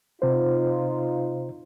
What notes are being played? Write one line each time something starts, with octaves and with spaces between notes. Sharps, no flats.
C3 D#4 F4 C5